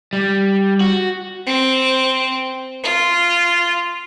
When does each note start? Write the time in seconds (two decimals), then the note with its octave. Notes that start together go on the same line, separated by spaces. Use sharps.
0.13 G3
0.81 F#4
1.47 C4
2.84 F4